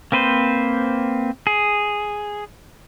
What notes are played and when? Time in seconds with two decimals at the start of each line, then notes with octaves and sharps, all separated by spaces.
0.12 A#3 C4 B4 C5
1.47 G#4